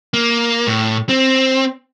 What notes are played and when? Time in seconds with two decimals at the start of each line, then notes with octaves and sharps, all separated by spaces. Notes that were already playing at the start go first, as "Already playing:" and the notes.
0.14 A#3
0.67 A2
1.09 C4